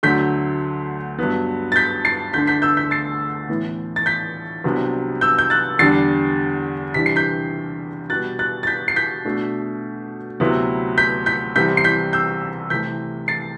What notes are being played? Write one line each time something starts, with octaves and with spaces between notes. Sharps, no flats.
D2 D3 F#3 A3 D4 G6 B6
G2 F#3 B3
A6
G6 B6
A6 C7
D2 D3 A3 D4 G6 B6
G6 B6
E6 G6
G6 B6
A6 C7
A2 E3 B3
A6
G6 B6
C2 C3 F#3 B3 D4
E6 G6
G6
F#6 A6
E2 D3 G3 D4 A6 C7
C3 E3 G3 D4 B6
C7
G6 B6
B2 G3 B3 F#6 A6
F#6 A6
A6
G6 B6
C7
G6 B6
B2 A3 D4
D2 C3 F#3 B3 E4
G6 B6
G6 B6
C2 C3 E3 G3 C4 G6 B6
C7
G6 B6
E6 G6
C2 C3 E3 A3 G6 B6
A6 C7